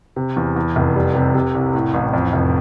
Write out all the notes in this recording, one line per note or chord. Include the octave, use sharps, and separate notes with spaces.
C3
E2
E2
F1
G3
C3
C3
C2
A2
A1
F2
F1